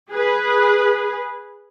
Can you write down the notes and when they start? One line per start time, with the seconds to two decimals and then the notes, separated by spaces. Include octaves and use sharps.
0.10 G#4 B4